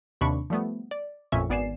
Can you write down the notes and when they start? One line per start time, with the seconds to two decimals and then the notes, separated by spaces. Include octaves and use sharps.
0.21 D#2 C3 D4 B5 C#6
0.50 F3 G3 A3 B3
0.91 D5
1.32 A1 F2 A#2 C#4 E5 C#6
1.50 G#1 B3 D5 G#5 C7 E7